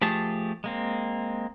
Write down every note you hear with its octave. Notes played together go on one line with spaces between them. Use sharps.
F3 A3 G4 G#4 A5
G#3 A#3 C4